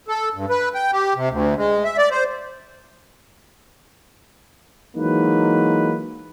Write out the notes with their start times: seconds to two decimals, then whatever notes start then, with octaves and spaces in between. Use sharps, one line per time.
0.08 A4
0.34 G2
0.50 B4
0.74 G5
0.92 G4
1.16 C3
1.30 D2
1.57 G#3
1.84 E5
1.98 D5
2.11 C5
4.96 E3 F#3 G#3 A#3 D#4 B4